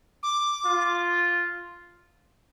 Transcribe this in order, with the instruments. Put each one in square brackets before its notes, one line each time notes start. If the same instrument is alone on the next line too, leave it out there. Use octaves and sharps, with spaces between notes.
[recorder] D6
[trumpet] F4